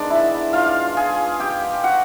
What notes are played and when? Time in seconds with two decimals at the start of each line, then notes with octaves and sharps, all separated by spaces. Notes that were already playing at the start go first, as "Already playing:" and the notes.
Already playing: D#3 G#3 B3 D4 D5
0.10 E4 E5
0.53 F4 F5
0.97 G#4 G#5
1.40 G4 G5
1.84 F#4 F#5